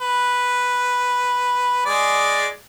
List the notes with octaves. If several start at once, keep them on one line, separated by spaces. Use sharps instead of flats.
B4
G#3 G#4 D5